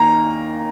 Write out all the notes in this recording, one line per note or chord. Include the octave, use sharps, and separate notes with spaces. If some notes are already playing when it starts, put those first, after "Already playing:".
Already playing: D#2 D#3 A#3 A#5